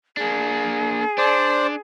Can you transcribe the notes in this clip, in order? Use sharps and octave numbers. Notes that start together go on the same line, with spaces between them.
A#3 D4 G#4
D4 C5 D5